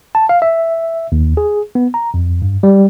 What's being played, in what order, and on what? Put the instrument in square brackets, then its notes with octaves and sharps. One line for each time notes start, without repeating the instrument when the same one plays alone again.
[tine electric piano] A5
F5
E5
D#2
G#4
B3
A#5
F2
G2
G3